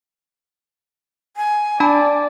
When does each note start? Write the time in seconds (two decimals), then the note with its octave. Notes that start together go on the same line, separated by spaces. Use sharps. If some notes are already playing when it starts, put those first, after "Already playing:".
1.37 G#5
1.80 D4 D5 A5 B5